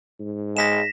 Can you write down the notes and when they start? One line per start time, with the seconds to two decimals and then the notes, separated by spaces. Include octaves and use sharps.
0.20 G#2
0.57 G#3 A#6 B6 E7